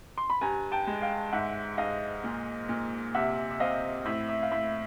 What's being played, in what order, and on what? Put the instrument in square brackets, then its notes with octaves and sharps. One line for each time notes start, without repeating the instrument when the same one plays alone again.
[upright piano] C6
B5
G2 G#5 A#5
G5 A5
G#3
F5 G5
G#2 E5 F#5
G#2 D#5 F5
A#2
A#2
C3 E5 F#5
E5
C4 D#5 F5
A2 E5
E5
F5
A2 E5